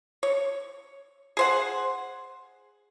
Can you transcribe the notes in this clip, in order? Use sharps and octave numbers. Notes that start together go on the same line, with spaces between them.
C#5
G#4 C5 F#5